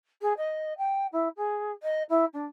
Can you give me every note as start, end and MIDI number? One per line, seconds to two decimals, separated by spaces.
0.21 0.33 68
0.37 0.73 75
0.78 1.07 79
1.12 1.28 64
1.37 1.72 68
1.83 2.03 75
2.09 2.25 64
2.33 2.45 62